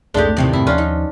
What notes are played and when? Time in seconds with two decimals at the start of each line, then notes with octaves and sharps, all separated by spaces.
0.14 C2 F2 G#2 G#3 A3 D4 G4
0.37 D#2 A2 C3 D#3 E3 C4
0.53 F2 G#2 C4 E4
0.67 D#2 F3 C#4 D4 F4
0.78 D#4